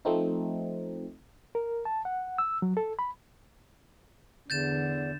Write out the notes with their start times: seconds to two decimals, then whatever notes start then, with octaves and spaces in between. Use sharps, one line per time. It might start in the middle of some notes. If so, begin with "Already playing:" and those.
0.05 F3 A3 C4 D#4
1.55 A#4
1.85 A5
2.05 F#5
2.38 E6
2.62 F#3
2.77 A4
2.99 B5
4.50 E2 D3 G6 A6 E7